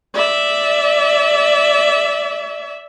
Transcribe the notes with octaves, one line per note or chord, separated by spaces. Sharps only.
D5 E5